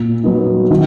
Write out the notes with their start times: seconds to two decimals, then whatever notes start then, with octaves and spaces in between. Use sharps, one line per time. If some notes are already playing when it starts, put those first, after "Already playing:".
Already playing: A#2
0.24 F#3 B3 D#4
0.71 D#3